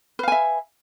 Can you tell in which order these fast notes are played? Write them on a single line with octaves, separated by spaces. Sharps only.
B4 F5 G#5 E5